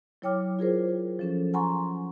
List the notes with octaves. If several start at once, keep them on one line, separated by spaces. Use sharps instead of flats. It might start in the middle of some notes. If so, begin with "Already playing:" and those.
F#3 E4 C#5 G5 D6 F6
F4 G#4 A#4 C5
F3 C#4 A4
F#5 G#5 A#5 C6 C#6